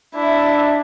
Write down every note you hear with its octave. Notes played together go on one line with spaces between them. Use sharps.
D4 E4